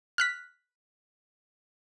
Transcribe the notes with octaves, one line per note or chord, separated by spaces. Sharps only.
F6 F#6 B6